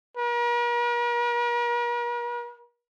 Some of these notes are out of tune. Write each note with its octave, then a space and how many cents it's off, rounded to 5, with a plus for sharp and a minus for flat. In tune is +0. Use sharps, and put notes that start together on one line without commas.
A#4 +45